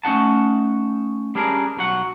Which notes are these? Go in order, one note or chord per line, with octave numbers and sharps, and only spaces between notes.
A3 C#4 D#4 F#5 A5
G3 C#4 D4 G#4 A#4
B1 F#3 F#5